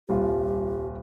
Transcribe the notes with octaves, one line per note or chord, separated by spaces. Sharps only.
D#1 C2 F4 G4